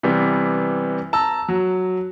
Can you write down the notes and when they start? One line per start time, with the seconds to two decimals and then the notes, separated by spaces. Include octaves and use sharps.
0.03 C3 E3 G3 B3
1.13 A5 A#5 E6
1.49 F#3